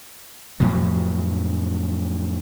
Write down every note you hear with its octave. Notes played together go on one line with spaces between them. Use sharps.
F2 A2 F3 F#3